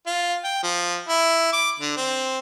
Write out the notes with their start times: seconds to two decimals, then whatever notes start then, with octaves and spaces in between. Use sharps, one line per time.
0.06 F4
0.44 G5
0.63 F3
1.09 E4
1.53 D6
1.80 D3
1.97 C4